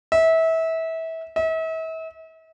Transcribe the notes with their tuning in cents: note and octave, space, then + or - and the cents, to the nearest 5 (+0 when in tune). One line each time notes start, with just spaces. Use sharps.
E5 -25
E5 -40